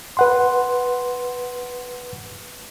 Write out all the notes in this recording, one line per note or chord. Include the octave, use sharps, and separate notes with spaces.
B4 F#5 C6